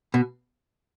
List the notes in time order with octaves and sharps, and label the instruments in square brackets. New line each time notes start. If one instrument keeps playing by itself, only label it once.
[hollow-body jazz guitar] B2